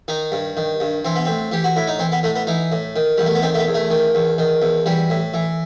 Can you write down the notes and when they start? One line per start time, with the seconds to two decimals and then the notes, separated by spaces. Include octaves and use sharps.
0.08 D#3 D#4
0.32 G2
0.57 D#3
0.80 G2
1.05 E3 C4
1.16 B3
1.25 A2 C4
1.52 E3 G4
1.64 F#4
1.76 A2 E4
1.87 D#4
1.99 E3 C4
2.12 B3
2.23 A2 A3
2.35 B3
2.47 E3 D#4
2.72 A2
2.96 D#3
3.18 E2 G3
3.26 A3
3.35 B3
3.42 D#3 C4
3.55 A3
3.59 B3
3.67 E2
3.74 A3
3.90 D#3
4.15 E2
4.38 D#3
4.62 E2
4.86 E3 G3
5.10 A2
5.34 E3